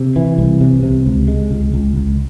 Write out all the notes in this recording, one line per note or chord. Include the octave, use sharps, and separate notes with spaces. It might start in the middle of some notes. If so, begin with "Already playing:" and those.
Already playing: C3
E3
C2
C3
C3
C#2
G#3
C#2
C#2
C#2